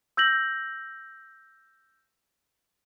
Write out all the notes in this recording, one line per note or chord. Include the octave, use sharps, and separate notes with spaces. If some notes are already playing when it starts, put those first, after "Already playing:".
E6 G6 A#6 F#7